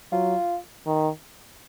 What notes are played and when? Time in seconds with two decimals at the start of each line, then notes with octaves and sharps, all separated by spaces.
0.12 F#3 F4
0.87 D#3